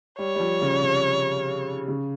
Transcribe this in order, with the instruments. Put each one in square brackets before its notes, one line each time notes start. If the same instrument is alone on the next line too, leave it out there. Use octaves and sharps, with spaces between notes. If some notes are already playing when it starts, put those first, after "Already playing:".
[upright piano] G3 [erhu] C#5
[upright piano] G3
F3
C#3
C3
C#3